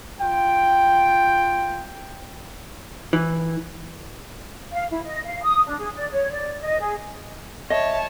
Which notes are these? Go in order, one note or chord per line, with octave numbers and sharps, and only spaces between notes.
F4 G5
E3
F5
E4
D#5
F5
D#6
D4
G#4
D5
C#5
D5
D#5
G#4
C#5 D#5 E5 A5